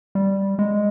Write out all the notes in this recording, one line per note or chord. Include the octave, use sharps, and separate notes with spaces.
G3
G#3